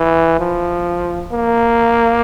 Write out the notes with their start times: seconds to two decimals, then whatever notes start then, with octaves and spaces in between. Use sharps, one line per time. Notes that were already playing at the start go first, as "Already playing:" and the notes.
Already playing: E3
0.40 F3
1.32 A#3